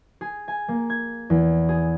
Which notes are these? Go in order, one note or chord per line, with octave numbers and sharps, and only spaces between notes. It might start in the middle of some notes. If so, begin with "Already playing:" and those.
G#4
G#5
A#3
G#6
E2
G#4